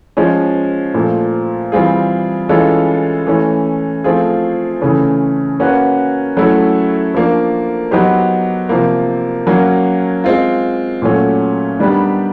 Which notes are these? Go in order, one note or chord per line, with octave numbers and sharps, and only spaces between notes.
F3 G#3 C#4
A#2 F3 A3
E3 G3 C4 F4 G#4
E3 G#3 C#4 F4 A4
E3 A3 C#4
F3 A3 C4 F4 G#4
C#3 E3 A3 C#4
A#3 C#4 F#4 B4
F#3 A3 C#4 E4 A4
F3 A#3 D4
F#3 B3 D#4 G4 C5
C3 F3 A#3
F#3 A#3 C#4
G#3 C4 F4
A#2 F#3 A3 C#4
D#3 G3 B3 D4 G4